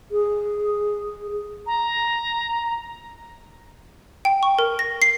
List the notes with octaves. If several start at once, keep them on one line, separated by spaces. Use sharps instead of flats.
G#4
A#5
G5
C#6
A#4
A#6
C7